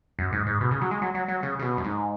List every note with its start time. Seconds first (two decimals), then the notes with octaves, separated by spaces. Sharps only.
0.19 F#2
0.33 G#2
0.47 G#2
0.61 B2
0.71 C#3
0.81 F#3
0.91 G#3
1.02 F#3
1.14 F#3
1.28 F#3
1.43 C#3
1.59 C#3
1.62 B2
1.77 F#2
1.84 G#2